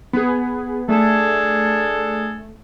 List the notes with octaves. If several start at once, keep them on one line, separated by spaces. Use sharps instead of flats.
B3 G#4
A3 D4 G#4 A4